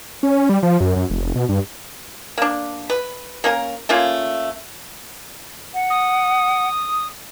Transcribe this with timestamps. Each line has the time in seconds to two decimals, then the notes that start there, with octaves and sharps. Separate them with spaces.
0.23 C#4
0.49 G3
0.63 F3
0.81 F#2
0.96 F#2
1.10 F1
1.36 B2
1.49 G2
2.38 A#3 D4
2.90 B4
3.44 A#3 C#4 A#4
3.89 A3 A#3 C#4 F4
5.74 F#5
5.90 D#6